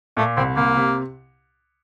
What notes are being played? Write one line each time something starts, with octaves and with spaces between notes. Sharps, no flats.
A#2 A3
C2 C4
C2 A#3
C3